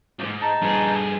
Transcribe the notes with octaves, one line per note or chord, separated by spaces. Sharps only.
C2 G#2
D#4 A5
G2 G#4